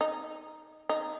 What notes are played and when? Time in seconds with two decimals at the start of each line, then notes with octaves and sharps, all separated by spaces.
0.01 D#4
0.89 D#4